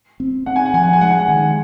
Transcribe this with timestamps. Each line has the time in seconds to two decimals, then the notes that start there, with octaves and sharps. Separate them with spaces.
0.20 C4
0.46 C4 F#5
0.56 G#5
0.66 F#5
0.74 F3 G#5
0.83 F#5
0.93 G#5
1.01 G#3 F#5
1.11 G#5
1.20 F#5
1.28 D#3 G#5
1.38 F#5